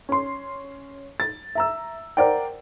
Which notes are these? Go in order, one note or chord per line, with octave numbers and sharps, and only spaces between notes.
C#4 C6
A6
E5 A#5 E6
A#4 C5 D5 F#5 G5